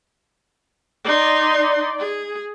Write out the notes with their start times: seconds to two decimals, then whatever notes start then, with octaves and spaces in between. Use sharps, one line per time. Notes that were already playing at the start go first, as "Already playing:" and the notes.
1.05 D#4 D5 C6
1.99 G#4